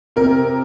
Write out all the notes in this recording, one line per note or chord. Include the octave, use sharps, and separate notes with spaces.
C3 A#4